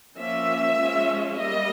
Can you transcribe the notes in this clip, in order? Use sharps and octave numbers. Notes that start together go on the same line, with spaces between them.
F3 A#3 C#4 E5
F3 G#3 C#4
G3 A#3 D#5